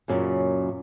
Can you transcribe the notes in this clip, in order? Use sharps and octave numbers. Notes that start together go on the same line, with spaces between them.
F#2 A#2 C#3